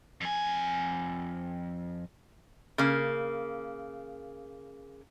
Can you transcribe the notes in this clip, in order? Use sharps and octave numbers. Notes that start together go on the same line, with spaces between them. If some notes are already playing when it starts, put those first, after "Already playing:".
F2 G#5
C#3 A#3